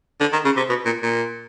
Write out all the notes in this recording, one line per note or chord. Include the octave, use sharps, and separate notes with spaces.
D3
D#3
C#3
C3
B2
A#2
A#2